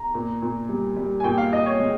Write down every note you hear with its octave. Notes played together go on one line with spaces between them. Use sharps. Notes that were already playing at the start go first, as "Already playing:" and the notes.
Already playing: A#5
A#2
A#2
G3
G3
G#5
A#2 G5
F5
A#2 D#5
C#5
G#3